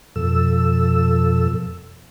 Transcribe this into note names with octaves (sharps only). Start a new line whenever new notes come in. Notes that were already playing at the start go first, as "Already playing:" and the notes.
F2 B2 F3 A4 E6